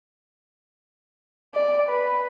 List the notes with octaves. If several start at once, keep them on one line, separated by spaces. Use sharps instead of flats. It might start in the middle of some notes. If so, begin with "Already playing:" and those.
D5
B4